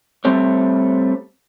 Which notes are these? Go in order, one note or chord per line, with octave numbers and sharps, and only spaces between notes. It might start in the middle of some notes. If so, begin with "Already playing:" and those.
G3 A3 C4 C#5